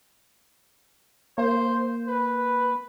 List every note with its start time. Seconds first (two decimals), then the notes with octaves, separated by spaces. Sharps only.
1.38 A#3 C5
2.08 B4